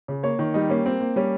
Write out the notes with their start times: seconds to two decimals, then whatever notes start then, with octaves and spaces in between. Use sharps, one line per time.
0.08 C#3
0.23 A#3 C#5
0.39 D#3
0.54 G3 D#4
0.69 A#3 C#4
0.86 A#3 C4
1.01 A#3
1.16 G3 C#4